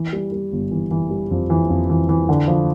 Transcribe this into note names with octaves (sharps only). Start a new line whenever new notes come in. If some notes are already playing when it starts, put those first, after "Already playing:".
Already playing: E3
G3
G3
G1
E3
E3
G3
F2
E3
F2
E3
E3
D3
F3